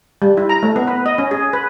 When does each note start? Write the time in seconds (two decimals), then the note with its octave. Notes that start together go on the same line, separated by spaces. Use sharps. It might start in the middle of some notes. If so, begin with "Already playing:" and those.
0.22 G3
0.37 E4
0.49 A#5
0.63 A3
0.76 B3
0.87 B4
1.06 D#5
1.18 C#4
1.31 G#4
1.53 B4